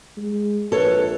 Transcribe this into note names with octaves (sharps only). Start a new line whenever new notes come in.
G#3
A#1 A4 B4 C#5